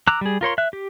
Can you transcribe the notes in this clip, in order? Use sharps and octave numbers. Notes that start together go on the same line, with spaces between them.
A#5 D6 E6 F#6
G3 G#4
F4 A#4 C#5 C6
E5 F#6
G4